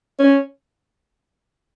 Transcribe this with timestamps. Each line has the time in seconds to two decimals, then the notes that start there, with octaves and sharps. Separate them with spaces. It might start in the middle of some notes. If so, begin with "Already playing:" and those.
0.19 C#4